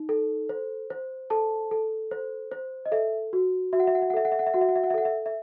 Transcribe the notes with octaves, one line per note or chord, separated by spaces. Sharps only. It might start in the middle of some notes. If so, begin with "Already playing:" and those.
Already playing: D#4
A4
C5
C5
A4 A5
A4
C5
C5
D#5
A4 E5
F#4
F#4 E5
F#5
E5
F#5
E5
F#5
A4 E5
F#5
E5
F#5
E5
F#4 F#5
E5
F#5
E5
F#5
E5
A4 F#5
E5
E5